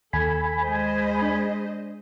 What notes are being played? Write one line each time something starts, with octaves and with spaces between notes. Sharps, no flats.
D#2 A4 G#5 B5
G#3 C5 D#5
D4